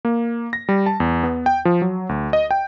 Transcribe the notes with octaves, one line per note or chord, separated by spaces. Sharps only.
A#3
A#6
G3
A5
E2
B3
G5
F3
F#3
D2
D#5
G5